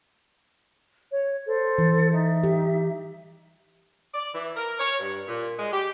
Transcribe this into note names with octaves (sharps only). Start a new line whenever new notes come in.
C#5
A4 C5
E3
D#4 E5
G4
D5
E3
A#4
C#5
G2
A#2
G#3
G4